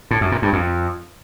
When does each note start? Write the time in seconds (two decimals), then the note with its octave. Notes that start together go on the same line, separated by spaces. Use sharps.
0.11 A2
0.21 F#2
0.32 A#2
0.42 G2
0.53 F2